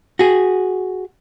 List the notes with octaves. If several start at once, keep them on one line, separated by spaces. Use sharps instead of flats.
F#4 G#4